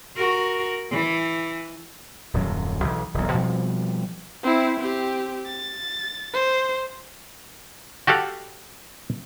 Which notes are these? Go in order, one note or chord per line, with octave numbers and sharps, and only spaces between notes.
F#4 A#4
E3
D#1 F#2 F#3
B1 E3
E1 B1
B2 F3 G3 C4
C4 E4
C4 G4
A6
C5
F#4 G4 A4 F5 F#5